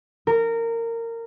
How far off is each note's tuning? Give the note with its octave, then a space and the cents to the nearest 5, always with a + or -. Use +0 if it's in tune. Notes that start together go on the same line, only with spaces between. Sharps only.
A#4 -20